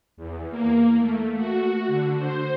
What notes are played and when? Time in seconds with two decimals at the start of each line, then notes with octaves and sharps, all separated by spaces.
0.17 E2
0.51 A#3
0.99 A3
1.37 F#4
1.88 D3
2.18 C5